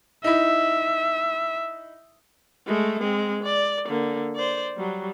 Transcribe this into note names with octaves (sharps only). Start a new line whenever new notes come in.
D#4 E4 E5
G#3 A3
G#3 C4
D5
D3 A#3
C5 D5
F#3 G3